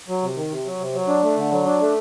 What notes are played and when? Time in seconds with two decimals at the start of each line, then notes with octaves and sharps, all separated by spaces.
0.08 F#3
0.22 C3
0.36 D#3
0.50 C3
0.65 F#3
0.79 C3
0.94 F#3
1.08 D4
1.23 A3
1.37 D3
1.51 F#3
1.65 D4
1.80 A3